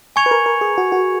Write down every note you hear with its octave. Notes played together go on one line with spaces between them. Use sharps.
G#5 C#6 G#6 C#7 F7
B4
A#4
A#4
G#4
F#4
F#4